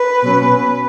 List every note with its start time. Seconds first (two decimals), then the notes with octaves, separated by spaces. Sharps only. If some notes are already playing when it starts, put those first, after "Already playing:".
Already playing: B4
0.22 B2 F#3 C#4